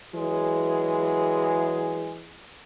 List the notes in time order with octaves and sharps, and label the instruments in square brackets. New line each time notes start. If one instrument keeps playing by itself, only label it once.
[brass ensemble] E3 F#3 G#3 G#4